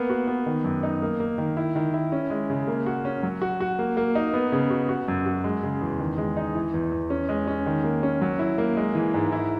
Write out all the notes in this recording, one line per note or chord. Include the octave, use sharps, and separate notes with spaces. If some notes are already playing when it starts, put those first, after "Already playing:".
Already playing: A#3 B3
F#4
B3
D#3
F#2
D#4
A#3
A#3
D#3
E4
D#3
E4
C#4
G#3
C#3
A#3
F#4
C#4
F#3
F#4
F#4
A#3
A#3
D#4
B3
C#3
F#4
F#4
F#2
F#4
G#3
C#3
E2
D#3
G#3
D#4
E3
E2
E2
C#4
G#3
C#4
D#3
A#3
C#4
F#3
E4
A#3
G#3
E3
G#2
E4